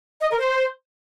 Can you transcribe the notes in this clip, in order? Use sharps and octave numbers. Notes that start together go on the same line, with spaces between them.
D#5
A#4
C5